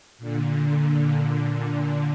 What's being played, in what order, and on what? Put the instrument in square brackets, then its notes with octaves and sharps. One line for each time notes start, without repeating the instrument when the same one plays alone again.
[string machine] A#2 D3